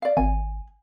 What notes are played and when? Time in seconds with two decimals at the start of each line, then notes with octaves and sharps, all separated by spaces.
0.02 D5 F5
0.17 G#1 G#5